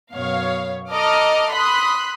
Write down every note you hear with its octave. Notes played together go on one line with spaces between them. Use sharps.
F#2 B2 C#5 F5
A4 D#5 A#5 D6 D#6 F6
B5 C6 D#6 F#6 B6